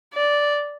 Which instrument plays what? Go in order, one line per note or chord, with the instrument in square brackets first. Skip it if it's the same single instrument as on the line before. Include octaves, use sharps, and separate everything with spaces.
[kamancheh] D5